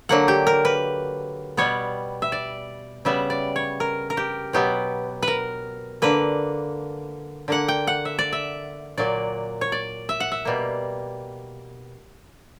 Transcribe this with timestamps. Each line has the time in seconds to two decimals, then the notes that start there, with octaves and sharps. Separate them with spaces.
0.09 D3 F#3 A#3 F#5
0.28 G4
0.47 A#4
0.65 B4
1.57 B2 G3 B3 C#5
2.22 E5
2.32 D5
3.05 C#3 G3 B3 E5
3.30 D5
3.56 C#5
3.80 A#4
4.10 A#4
4.17 G4
4.53 B2 F#3 B3 G4
5.23 B4
5.28 A#4
6.02 D3 A#3 B4
7.48 D3 A#3 F#5
7.68 G5
7.87 F#5
8.05 E5
8.19 D5
8.33 E5
8.98 A#2 F#3 A#3 D5
9.61 C#5
9.72 D5
10.09 E5
10.20 F#5
10.32 E5
10.45 B2 G3 A#3